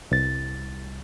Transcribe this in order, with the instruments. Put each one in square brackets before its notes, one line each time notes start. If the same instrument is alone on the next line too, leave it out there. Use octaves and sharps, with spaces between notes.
[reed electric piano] C2 A6